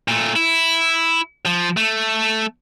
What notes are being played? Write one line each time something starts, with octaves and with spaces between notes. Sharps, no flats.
A#2 A3
E4
F3
A3